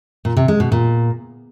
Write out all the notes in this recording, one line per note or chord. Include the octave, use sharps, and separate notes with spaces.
A#2
C3
G#3
B2
A#2